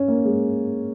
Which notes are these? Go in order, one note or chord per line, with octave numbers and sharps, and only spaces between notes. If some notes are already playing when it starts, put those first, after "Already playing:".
Already playing: C#4
A#3
G#3